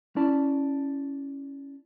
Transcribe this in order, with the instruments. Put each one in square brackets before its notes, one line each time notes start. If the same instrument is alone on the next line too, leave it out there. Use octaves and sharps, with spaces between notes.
[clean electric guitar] C#4 E4 D5 A5